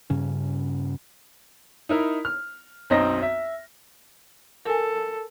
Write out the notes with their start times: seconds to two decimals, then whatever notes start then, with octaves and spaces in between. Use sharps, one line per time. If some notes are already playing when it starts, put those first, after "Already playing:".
0.10 G2 C#3 C#4
1.89 D#4 E4 A#4
2.25 F6
2.90 B1 F#2 C4 D#4 D#5 A#6
3.22 E5
4.66 A4 A#4 G#5